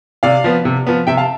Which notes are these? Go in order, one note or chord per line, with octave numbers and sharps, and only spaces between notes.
C3 D5 F5
F3 B3
C3
F3 B3
C3 E5 G5
F5 A5